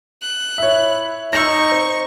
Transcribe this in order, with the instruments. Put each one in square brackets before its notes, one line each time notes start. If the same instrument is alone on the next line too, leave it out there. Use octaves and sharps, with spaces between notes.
[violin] F#6
[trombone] E4 [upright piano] C#5 E5
[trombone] D#4 [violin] C#6 [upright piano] E6 G6 A#6
[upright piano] C4